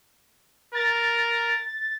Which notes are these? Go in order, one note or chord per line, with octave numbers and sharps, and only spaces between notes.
A#4 A6